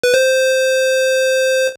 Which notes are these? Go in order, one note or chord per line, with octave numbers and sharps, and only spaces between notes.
B4
C5